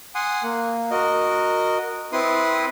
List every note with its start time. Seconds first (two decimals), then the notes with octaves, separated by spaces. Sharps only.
0.15 F#5 G#5 C6 D#6
0.43 A#3
0.91 F#4 A#4 D#5
2.13 C4 E4 B4 C6 D#6